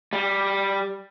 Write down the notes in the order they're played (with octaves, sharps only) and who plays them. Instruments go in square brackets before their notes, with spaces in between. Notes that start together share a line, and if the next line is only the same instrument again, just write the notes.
[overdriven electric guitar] G3